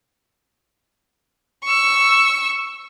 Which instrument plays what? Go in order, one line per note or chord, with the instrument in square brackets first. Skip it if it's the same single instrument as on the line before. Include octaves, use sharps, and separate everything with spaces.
[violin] C#6 E6